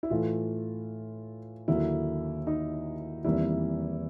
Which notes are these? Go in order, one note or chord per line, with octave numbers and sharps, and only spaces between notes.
E4
A2 E3 A3 F4
D#2 D3 F#3 A#3 E4
D#4
E2 C3 D#3 G3 A#3 E4